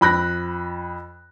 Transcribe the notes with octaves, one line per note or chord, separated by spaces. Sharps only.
F2 B5 F#6 A#6